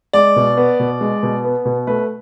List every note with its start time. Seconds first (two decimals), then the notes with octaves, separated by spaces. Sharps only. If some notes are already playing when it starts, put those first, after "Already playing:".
0.13 G#3 D5
0.36 B2
0.57 B3
0.80 B2
1.01 G#3
1.23 B2
1.44 B3
1.65 B2
1.87 A3 B4